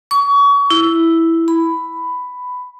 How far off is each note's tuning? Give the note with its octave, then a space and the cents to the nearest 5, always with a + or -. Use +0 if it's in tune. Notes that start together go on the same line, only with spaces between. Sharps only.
C#6 +30
E4 +0
B5 +10